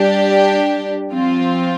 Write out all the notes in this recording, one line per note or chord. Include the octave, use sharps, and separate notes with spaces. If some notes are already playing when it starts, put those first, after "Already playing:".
Already playing: G3 D4 G4
F3 C4 F4